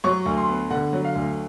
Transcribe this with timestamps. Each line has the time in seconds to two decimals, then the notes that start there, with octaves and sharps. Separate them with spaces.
0.04 F#3 C#6
0.26 D2
0.37 C6
0.48 B3
0.70 D3 F#5
0.93 F#3
1.04 F5
1.15 D2